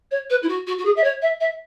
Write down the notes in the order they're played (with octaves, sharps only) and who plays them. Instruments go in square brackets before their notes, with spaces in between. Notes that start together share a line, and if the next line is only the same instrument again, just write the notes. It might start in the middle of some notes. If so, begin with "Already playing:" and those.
[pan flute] C#5
B4
E4
F#4
F#4
F#4
G#4
E5
C#5
E5
E5